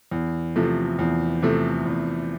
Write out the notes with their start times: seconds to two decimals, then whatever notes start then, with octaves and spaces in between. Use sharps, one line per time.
0.11 E2
0.56 C3 F3 A3
0.99 E2
1.42 C3 F3 A3
1.85 E2